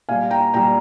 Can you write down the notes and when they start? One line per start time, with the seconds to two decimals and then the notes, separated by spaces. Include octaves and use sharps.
0.09 A#2 G3 F5 G#5
0.31 G5 A#5
0.54 A#2 G3 G5 A#5